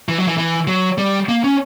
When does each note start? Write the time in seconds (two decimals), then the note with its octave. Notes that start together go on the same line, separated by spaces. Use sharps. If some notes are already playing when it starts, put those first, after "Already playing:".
0.09 E3
0.18 F#3
0.27 E3
0.38 E3
0.67 F#3
0.98 G3
1.29 A#3
1.44 C#4